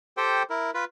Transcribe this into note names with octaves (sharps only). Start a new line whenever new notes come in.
G4 A4 C5 G5
E4 A#4
F4 B4